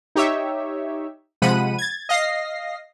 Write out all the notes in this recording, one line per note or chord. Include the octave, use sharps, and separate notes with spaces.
D#4 G4 C#5 E5
C3 F3 G#3 F#5 B5 D#7
G#6 A6
D#5 F5 A#6 C7